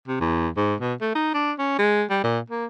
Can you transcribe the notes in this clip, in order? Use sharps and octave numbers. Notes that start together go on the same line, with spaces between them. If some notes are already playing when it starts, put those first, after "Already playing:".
C3
E2
G#2
B2
A3
D#4
D4
C#4
G#3
G3
A#2
A#3